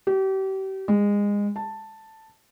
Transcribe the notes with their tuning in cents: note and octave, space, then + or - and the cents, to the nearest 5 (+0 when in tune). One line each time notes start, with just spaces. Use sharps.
G4 -35
G#3 -25
A5 +5